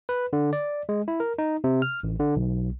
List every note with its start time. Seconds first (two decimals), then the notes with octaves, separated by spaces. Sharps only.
0.09 B4
0.33 D3
0.53 D5
0.89 G#3
1.08 E4
1.20 A#4
1.38 D#4
1.64 C3
1.82 F6
2.03 A1
2.20 D3
2.36 B1